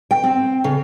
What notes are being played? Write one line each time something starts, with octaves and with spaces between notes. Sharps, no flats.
G5
C4
C#3